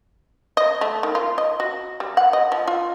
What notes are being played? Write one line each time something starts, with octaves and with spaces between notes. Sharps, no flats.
D#5
A3
D#3
F4
D#5
F#4
G3
F#5
D#5
F3
F4